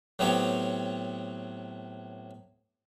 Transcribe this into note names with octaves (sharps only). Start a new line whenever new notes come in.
A2 F#3 B3 C4 G4 C#5